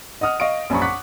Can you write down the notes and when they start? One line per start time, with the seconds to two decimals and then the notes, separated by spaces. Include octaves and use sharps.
0.21 D#5 F#5 D#6 F6
0.40 D#5 F5 C#6 D7
0.70 A#1 F#2 C5 B5 C#6
0.81 F#5 C#6 D6 F#6 B6